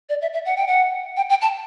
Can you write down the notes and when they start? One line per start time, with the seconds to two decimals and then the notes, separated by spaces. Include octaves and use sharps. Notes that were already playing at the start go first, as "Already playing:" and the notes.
0.09 D5
0.22 E5
0.33 E5
0.45 F#5
0.56 G5
0.67 F#5
1.17 G5
1.30 G5
1.42 A5